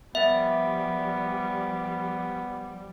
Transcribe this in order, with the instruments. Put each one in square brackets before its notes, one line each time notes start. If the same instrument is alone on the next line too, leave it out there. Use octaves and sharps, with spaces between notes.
[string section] F3 G3 [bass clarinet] B3 [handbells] E5